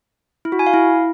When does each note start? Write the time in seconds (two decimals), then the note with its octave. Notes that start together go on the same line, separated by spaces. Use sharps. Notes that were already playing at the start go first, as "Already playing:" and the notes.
0.45 E4
0.52 F#4
0.59 G#5
0.66 F5
0.74 E4